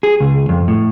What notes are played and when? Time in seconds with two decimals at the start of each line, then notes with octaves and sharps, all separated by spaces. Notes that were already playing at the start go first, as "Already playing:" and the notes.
0.03 G#4
0.20 C#2
0.49 F2
0.68 A2